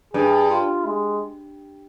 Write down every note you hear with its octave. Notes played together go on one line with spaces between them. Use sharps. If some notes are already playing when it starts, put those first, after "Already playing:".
G2 G#4
F4
G#3